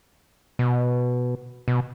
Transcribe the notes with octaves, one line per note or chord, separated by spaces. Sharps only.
B2
B2